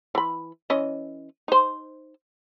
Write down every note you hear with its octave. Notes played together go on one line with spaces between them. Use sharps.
E3 B5
E3 C#4 D#5
D#4 C5